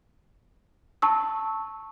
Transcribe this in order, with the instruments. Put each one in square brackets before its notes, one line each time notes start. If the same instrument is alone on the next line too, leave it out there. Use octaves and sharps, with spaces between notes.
[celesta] A5 C#6 E6